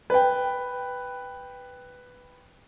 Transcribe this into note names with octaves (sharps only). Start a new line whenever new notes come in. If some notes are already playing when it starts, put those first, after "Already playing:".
B4 G5